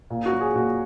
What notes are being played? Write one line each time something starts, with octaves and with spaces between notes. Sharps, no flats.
A#2
F#4
F#3
G#4
A#2 F#4